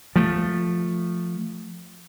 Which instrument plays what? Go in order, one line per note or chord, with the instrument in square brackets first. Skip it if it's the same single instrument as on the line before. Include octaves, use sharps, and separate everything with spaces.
[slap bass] F3 A3